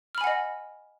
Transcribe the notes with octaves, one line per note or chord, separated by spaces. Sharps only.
D#5 F#5 G#5 B5 F6